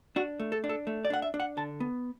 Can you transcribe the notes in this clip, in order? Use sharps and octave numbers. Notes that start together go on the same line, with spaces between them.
D4 F#4
A3
A4
D4
A4
A3
D5
D4 F#5
E5
D4
F#5
D3 A5
B3